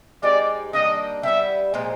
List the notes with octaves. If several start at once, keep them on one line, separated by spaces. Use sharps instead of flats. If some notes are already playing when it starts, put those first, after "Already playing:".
G#3 C4 D#4 G4 D5
D#3 G3 A#3 D4 D#5
G3 B3 E4 E5
A#2 F3 G#3 C4